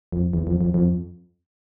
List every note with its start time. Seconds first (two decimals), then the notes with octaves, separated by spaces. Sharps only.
0.12 F2
0.33 E2
0.47 F2
0.61 F2
0.74 F2